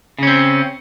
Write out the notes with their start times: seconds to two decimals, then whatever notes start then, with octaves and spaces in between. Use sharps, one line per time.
0.19 C#3
0.23 C#4
0.27 C4